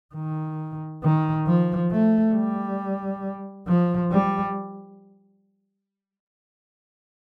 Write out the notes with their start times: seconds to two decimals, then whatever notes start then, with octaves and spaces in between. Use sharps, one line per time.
0.15 D#3
1.03 D#3
1.47 F3
1.91 A3
2.35 G3
3.68 F3
4.11 G3